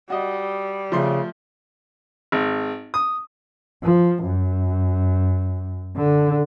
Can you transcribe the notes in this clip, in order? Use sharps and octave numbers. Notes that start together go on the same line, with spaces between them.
G3 F#4 D#5
C#3 F3 A3 C6
G#1
D#6
F3
F#2
D3